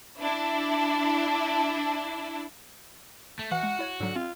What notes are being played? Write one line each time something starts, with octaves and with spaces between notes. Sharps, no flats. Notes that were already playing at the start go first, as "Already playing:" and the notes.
D4 E4
A3
E3 F#4 F#5
G#3
E4 C#5 G#6
G#2 D3 F#3
C4 F4